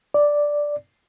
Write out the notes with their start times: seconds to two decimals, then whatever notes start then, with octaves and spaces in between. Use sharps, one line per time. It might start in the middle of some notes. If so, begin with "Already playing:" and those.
0.14 D5